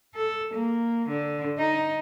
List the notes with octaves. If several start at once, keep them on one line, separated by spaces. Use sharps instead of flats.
A4
A#3
D3
D#4